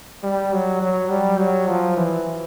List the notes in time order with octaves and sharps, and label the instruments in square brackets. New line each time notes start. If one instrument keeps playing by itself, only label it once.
[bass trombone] G3
F#3
F#3
G3
F#3
F3
E3